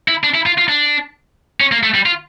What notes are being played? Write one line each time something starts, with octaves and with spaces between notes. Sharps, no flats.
E4
D4
E4
F4
F4
D4
C#4
A#3
A3
G3
F4